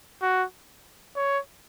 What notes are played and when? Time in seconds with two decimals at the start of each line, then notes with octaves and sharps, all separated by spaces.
0.22 F#4
1.16 C#5